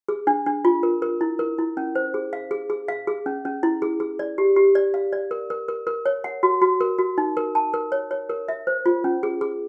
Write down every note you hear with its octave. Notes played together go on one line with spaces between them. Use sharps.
G#4
D4
D4
F4
A#4
A#4
E4
A#4
E4
C#4
C5
G#4
F5
G#4
G#4
F5
G#4
C#4
C#4
E4
G#4
G#4
D5
G4
G4
D5
F5
D5
A#4
A#4
A#4
A#4
C#5
F#5
F#4
F#4
A#4
F#4
D#4
A#4
A5
A#4
C#5
C#5
A#4
E5
C5
F4
C#4
G#4
G#4